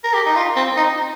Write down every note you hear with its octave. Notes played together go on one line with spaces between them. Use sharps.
A#4
G4
D#4
F4
C4
D#4